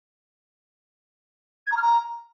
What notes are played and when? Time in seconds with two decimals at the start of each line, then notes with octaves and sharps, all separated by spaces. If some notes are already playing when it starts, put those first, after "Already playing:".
1.66 G#6
1.71 A#5
1.76 F6
1.82 A#5